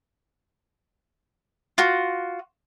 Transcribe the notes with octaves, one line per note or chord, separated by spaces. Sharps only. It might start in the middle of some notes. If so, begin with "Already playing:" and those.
F4 F#4